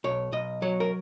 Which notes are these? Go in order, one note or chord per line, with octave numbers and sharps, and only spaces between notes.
B1 C#5
B1 D#5
F#3 C#5
A#4